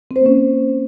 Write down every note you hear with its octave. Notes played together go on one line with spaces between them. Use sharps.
C4
C5
A#3
C#4